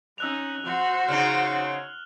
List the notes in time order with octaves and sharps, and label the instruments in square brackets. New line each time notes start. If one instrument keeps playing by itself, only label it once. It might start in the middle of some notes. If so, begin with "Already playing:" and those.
[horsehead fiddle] C#4 D#4 [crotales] E6 F#6 F7
[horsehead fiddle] F#4 C5
[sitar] C#3 C#4 D#4 [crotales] F6 E7